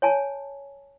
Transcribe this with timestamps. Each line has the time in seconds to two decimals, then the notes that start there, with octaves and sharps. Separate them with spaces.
0.02 C#5 G#5 A5